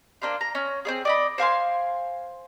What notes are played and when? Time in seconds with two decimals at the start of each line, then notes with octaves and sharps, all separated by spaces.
0.22 A#3 D4 C5 F5
0.41 A#5
0.55 C#4
0.85 C4 C#4 G#4
1.05 D5 D#5 B5
1.38 C5 F5 G#5 C6